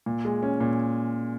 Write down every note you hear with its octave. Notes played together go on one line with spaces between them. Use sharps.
A#2
G#3
C#4
A#2